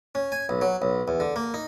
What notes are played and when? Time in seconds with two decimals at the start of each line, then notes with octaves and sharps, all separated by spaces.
0.15 C#4
0.32 G#5
0.49 B1
0.62 F#3
0.82 B1
1.08 E2
1.20 D3
1.36 A#3
1.54 D#4